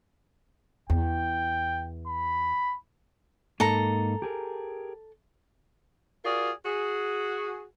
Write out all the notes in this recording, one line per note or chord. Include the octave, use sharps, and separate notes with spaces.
E2 G5
B5
G#2 A#3 D#4 A4 A#5
G4 G#4 A#4
F4 F#4 G#4 A#4 D5
F#4 G#4